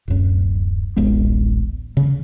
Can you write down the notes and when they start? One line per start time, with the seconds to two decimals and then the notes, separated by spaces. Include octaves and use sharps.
0.08 D1 F#2
0.96 D1 A1 G#3 B3
1.97 C#3